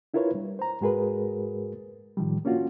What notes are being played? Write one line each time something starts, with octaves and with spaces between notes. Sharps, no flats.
D4 E4 F4 A#4 B4 C#5
G3
C5 A#5
G#2 G#3 F#4 G#4 A#4 B4
A2 D#3 F3 G3
A#3 C#4 D4 F4 F#4